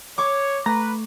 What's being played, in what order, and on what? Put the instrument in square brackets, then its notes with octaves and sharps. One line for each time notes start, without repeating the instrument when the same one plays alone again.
[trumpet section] C#5 [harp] C#6 D6
[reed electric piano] A3 [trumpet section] B4 [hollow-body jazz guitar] A#5